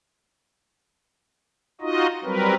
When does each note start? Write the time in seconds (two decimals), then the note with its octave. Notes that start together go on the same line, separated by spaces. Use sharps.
1.81 D#4 F4 F#4 D#5
2.24 F#3 G3 C4 A#4 B4